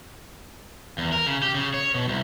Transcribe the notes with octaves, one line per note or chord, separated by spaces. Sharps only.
E2
A#4
C#3
G4
C#3
C#5
B2
C2